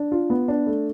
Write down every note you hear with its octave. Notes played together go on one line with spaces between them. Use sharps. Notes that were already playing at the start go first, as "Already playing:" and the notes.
Already playing: D4
F4
B3
D4
A3